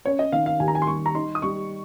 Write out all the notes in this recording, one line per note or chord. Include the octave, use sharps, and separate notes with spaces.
C#4 C#5
D#5
D#3 F5
F5
D#2 G#5
A#5
G#5
C6
G3 C#6
A#5
D#4 C6
D#6
G3 C#6